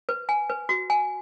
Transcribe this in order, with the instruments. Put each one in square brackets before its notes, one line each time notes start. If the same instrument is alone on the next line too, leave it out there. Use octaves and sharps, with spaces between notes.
[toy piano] B4
G#5
B4
F#4
G#5